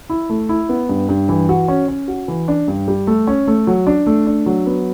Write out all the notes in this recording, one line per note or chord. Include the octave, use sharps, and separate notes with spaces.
E4
A3
E4
B3
G2
G2
E3
F#4
C#4
C#4
F#4
E3
D4
G2
G3
A3
C#4
A3
F#3
D4
A3
D4
F#3
B3